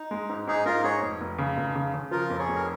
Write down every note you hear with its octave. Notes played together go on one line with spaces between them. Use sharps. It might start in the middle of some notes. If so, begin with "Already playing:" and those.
Already playing: D#4
G#3
G#2
G#2 D#4 G#4
G#2 F4 A#4
G#2 G#4 C#5
F1
F1
C#3
F1
C#3
C#3
F3 F4 A#4
F2
G#4 C#5
F1
A#4